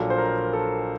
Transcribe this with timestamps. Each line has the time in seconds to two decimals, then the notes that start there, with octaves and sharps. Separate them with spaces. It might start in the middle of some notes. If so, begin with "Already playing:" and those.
Already playing: A#1 A#2 F#3 A4
0.10 C5
0.18 A#4
0.53 A4